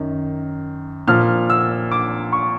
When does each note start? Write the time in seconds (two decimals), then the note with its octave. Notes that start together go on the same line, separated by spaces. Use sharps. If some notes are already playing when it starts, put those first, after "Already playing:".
Already playing: F#2 D#3
1.07 A#2 F3 F6
1.50 E6
1.91 D6
2.32 C#6